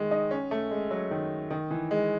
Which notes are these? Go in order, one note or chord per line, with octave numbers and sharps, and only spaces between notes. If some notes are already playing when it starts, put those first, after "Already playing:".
Already playing: D#3 G#3
D#4
C#4
A3
G#3
F#3
D#3
D#3
E3
G#3